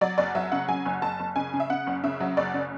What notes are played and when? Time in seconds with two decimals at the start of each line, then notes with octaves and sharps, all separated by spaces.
0.01 F#3 D5
0.18 F#1 D5
0.35 F#3 E5
0.52 C#3 F#5
0.68 F#3 G#5
0.86 F#1
1.02 F#1 A5
1.20 F#1
1.36 C#3 G#5
1.54 C#3
1.60 E5
1.70 C#3 F#5
1.87 F#1
2.04 C#3 E5
2.20 F#3
2.37 F#1 D5
2.54 C#3